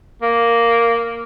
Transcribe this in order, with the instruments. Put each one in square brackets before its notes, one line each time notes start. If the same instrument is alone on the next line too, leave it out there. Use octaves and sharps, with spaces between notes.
[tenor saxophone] A#3